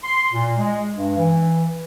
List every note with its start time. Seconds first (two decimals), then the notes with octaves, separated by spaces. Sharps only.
0.04 C6
0.32 A#2
0.56 G#3
0.94 G2
1.17 E3